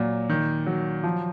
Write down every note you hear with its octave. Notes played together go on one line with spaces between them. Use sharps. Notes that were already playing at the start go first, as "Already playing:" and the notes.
Already playing: A#2 F#3
D#3
F#3
F3